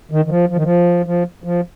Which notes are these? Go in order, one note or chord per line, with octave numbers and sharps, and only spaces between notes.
D#3
D#3
F3
F3
D#3
F3
F3
F3